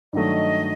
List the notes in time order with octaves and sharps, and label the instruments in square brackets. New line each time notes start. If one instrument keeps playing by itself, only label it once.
[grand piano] G2 D#3 F#3 A3 [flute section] D#5